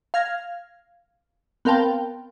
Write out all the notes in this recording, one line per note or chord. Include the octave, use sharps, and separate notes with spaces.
F5 F6 G#6 A#6
B3 C4 A#4 F5 G5 A5